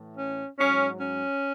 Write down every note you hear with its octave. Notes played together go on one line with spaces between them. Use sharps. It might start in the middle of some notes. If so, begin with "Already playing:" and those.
Already playing: A2 E3
C#4
G#2 F#3 C#4
C#4